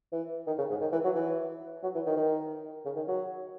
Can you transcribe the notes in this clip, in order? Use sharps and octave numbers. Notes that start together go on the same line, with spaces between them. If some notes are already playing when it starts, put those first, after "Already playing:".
E3
D#3
C#3
G#2
D#3
E3
F#3
E3
F#3
E3
D#3
D#3
C#3
D#3
F#3